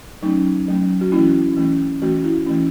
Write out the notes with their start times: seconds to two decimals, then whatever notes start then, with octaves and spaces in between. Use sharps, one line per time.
0.22 F#3 A3 C#4 D#4
0.68 F#3 A3 C#4
1.01 F#4
1.12 E3 A3 C#4 E4
1.57 E3 A3 C#4
2.02 E3 A3 C#4 F#4
2.24 E4
2.46 E3 A3 C#4